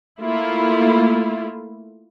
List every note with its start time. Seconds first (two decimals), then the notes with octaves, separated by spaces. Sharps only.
0.20 A3 A#3 E4 F4